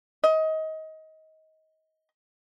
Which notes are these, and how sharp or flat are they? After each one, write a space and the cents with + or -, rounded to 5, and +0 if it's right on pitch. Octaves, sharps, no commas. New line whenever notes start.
D#5 +25